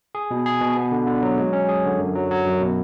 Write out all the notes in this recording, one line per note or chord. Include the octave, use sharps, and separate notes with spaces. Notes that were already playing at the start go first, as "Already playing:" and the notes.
G#4
B2
G#4
B2
B3
D3
D3
F#3
G#3
C#4
G#4
D3
F#2
F#3
F#3
F#2
B2